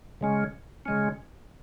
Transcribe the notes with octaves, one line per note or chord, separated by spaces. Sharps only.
C#3 G#3 C#4
C#3 G#3 C#4